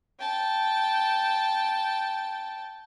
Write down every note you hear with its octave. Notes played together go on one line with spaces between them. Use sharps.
G5 A5